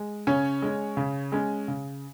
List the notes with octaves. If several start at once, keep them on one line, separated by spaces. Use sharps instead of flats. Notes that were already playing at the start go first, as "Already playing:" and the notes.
Already playing: G#3
C#3 C#4 C#5
G#3 C#4
C#3
G#3 C#4
C#3